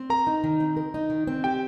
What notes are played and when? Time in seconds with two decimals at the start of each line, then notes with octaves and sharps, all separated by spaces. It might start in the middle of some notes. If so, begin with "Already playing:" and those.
Already playing: C4
0.10 A#4 A#5
0.27 D#4
0.44 D#3
0.60 C4
0.77 A#4
0.94 D#4
1.10 D#3
1.27 C4
1.44 G4 G5